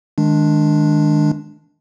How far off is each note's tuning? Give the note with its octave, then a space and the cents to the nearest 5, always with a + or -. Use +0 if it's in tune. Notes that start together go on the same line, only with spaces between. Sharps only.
D#3 +0 G#3 +15 D4 +0